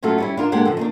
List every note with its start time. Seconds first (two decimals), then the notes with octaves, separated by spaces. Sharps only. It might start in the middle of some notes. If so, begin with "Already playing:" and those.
0.02 F#3 A3 C#4 F4 F#4 A4
0.18 G3 C#4 E4
0.37 D4 F4 A#4
0.52 G#3 A#3 D4 G4 A4 F#5
0.65 C#3 F3 A4
0.77 D#3 A#3 D4